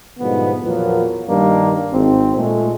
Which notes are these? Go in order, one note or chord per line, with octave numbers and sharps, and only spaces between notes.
G#2 B2 D3 F3 G3 B3
E2 A#2 F3 F#3 A#3 B3
G2 D#3 G3 A#3 D4
G#1 C4
A#2 G#3 A3